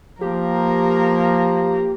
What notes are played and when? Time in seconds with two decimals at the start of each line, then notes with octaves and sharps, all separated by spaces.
0.21 F3 A#3 G4 A#4